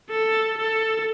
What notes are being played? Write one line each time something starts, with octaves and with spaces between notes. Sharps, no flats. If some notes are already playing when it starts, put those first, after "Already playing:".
A4
A4